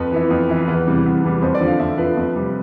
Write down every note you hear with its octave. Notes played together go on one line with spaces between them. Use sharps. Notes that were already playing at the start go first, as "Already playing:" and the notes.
Already playing: F2 B4
E3 B3 E4
F2
E3 B3 E4
E2 B4
C3 E3 G3
E2
C3 E3 G3
F2 C5
D5
D3 F3
F5
F2 E5
D3 F3 B4
F2
C3 G3